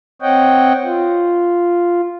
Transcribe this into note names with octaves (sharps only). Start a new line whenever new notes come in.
C4 C#5 D#5 F#5 G5
F4